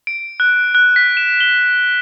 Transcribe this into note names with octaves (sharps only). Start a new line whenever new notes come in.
D7
F#6
F#6
B6
E7
G7